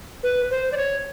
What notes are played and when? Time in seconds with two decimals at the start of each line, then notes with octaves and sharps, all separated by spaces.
0.23 B4
0.50 C5
0.72 D5
0.77 C#5